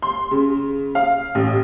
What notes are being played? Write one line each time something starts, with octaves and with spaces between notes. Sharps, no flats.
C6
C#3
F5
A1